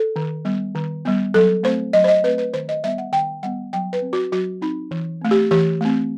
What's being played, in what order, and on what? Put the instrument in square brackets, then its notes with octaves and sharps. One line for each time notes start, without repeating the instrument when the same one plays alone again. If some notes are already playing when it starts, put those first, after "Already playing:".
Already playing: [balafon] A4
D#3
G3 B3
D#3
G3 B3
F#3 A4
A3 C4 C5
F#3 D#5
C5
D#5
C4 B4
A3
B4
D#3 C5
D#5
G3 B3 E5
F#5
D#3 G5
G3 B3 F#5
F#3 G5
B4
C4
F#4
F#3 F#4
C4 D#4
E3
A3 C4
G4
E3 G4
A3 C4